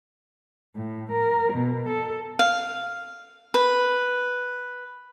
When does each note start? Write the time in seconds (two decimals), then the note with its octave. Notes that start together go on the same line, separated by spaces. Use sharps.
0.75 A2
1.11 A#4
1.53 B2
1.88 A4
2.39 F5
3.54 B4